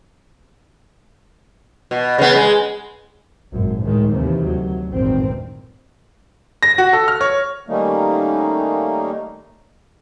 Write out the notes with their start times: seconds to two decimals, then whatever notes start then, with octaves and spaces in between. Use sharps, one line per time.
1.91 B2
2.18 C#3 B3
2.35 G#3
3.52 G#1 F#2 A#2
3.82 C#2 A2 D#3 G#3
4.12 D#2 C3 D#3 E3
4.46 D2 F#3
4.89 G#1 E2 G2 A#2 D#3 C4
6.63 A#6
6.78 F#4
6.93 A4
7.08 F6
7.21 C#5
7.68 D#3 G3 A3 A#3 C#4 D#4